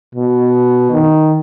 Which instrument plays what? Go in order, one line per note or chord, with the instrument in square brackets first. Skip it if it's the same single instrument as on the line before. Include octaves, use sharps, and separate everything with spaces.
[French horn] B2
D#3